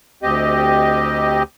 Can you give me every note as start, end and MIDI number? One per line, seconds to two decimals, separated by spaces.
0.23 1.43 38
0.23 1.43 60
0.23 1.43 67
0.23 1.43 75